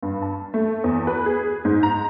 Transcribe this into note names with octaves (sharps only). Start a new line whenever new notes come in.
G2
A5
A3
E2
B4
G#4
G#2
A#5